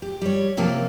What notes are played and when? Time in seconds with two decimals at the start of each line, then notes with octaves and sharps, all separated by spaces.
0.02 G4
0.22 G3 C#5
0.57 C3 F3 A#3 C4 C#4